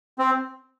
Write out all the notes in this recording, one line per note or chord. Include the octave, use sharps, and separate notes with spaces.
C4